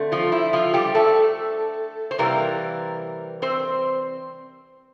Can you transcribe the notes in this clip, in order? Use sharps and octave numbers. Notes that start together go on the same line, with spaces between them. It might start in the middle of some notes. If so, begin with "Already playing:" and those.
Already playing: D3 A3 C4
F3 F4
E4
F3 F4
G3 G4
A3 A4
C5
C3 E3 G3 A#3 A#4
C4 C5